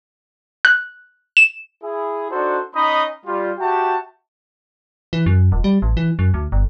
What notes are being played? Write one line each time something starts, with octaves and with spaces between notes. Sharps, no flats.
F#6
E7
E4 G#4
D4 D#4 F#4 A4 C5
C#4 D#4 D#5 B5 D#6
G3 F4
F#4 G4 E5 G5 A5
E3
F#2
D#1
G3
A1
E3
F#2
D2
G1